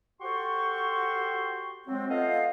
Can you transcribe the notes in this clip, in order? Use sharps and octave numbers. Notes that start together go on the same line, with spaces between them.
F#4 G4 A4 C5 C6 C#6
F#3 G#3 C4
A3 B3 F4 C5 D#5 F5